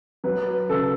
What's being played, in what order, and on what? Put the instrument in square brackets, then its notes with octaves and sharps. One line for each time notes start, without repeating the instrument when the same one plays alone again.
[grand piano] F#3 B4
C#3 A4